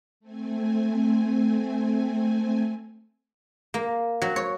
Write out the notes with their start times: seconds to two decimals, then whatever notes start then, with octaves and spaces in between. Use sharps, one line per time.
0.20 A3 C4 G#5
3.74 A#3
4.22 F#3
4.36 C#5